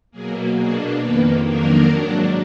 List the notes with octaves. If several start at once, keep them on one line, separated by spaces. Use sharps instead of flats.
B2 F#3 A#3 G#4
B2 A#3 D4 G#4
F2 D#3 A#3 B3 B4
F2 D#3 F#3 A#3 D4 A#4
G#2 F#3 D4